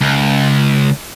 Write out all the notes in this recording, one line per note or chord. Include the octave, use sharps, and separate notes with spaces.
C#2